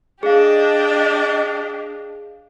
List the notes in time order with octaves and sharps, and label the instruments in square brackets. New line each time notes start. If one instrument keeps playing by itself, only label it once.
[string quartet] D4 G4 D#5 [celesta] G#4 F5